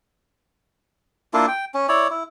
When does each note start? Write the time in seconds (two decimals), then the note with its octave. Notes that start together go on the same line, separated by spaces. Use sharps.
1.34 A#3 D4 E4 F4
1.48 G5
1.74 C#4
1.89 E4 C#5 D5
2.10 E4